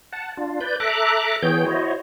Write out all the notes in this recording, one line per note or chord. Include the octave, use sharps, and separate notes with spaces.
F#5 A5
D4 F4
B4 D5 G6
A4 E5 A#5 D6 F#6
E3 B3 G#4 C#5 G5 G6
E4 F#4 C5 C#5 D#5